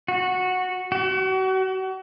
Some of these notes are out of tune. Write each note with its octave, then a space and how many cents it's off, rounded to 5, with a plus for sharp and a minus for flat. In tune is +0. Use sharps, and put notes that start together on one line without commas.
F#4 -10
F#4 +35